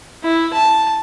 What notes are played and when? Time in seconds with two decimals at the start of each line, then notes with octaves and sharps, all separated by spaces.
0.24 E4
0.53 A5